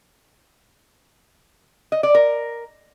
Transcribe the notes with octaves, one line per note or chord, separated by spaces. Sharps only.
D#5
D5
A#4